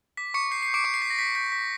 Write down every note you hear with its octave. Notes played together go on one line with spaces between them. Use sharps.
D6 B6
C#6 D6 C#7
G6 C7
C7
G6
D6 D7
C#6 D6 C#7
C7
D6 B6
A#6
G6 B6
G6 B6
D6 B6